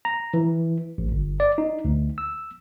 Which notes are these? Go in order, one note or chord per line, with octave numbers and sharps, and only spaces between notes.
A#5
E3
A1
G1
D5
D#4
D2
E6